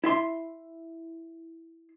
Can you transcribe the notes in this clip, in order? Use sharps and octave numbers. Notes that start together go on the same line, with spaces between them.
E4 E5 C6